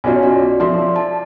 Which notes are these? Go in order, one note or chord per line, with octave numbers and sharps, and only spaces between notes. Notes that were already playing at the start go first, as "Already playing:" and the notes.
B1 C#4 F4 F#4 D5 G#5
D5
F3 A4 D5 E5 C6
A5